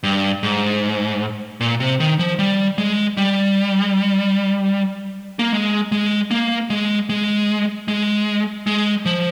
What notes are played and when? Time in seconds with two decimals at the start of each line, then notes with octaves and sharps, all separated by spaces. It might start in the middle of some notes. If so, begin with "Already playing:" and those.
0.03 G2
0.43 G#2
1.61 A#2
1.80 C3
2.00 D#3
2.19 F3
2.39 G3
2.78 G#3
3.17 G3
5.39 A#3
5.53 G#3
5.92 G#3
6.31 A#3
6.70 G#3
7.09 G#3
7.88 G#3
8.67 G#3
9.06 F3